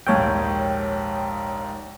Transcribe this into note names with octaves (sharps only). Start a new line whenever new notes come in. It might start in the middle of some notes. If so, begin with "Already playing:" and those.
A#1 D#2 G#2 C#5 G5